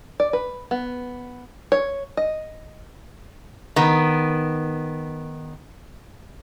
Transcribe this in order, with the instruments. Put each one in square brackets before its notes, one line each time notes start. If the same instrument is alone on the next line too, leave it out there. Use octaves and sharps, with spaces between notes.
[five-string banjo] D5
B4
B3
C#5
D#5
[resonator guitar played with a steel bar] D#3 B3